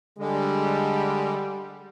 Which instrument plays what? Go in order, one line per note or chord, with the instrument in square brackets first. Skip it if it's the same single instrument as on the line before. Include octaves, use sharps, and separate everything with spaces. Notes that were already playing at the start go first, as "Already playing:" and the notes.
[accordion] D3 G#3 [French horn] G3